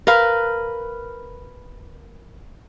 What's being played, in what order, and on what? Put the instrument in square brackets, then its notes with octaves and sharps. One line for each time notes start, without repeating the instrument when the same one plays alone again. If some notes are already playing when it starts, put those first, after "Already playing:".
[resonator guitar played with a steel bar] A#4 B4 F5